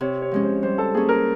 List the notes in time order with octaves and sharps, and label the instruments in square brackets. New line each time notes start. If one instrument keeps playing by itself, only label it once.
[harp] C3 [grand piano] C#5
[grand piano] C#5
[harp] F3 G#3 C#4
[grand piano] C5
[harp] G3 [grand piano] C5
[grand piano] A4
[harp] A#3 C#4 [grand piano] G#4
[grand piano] A#4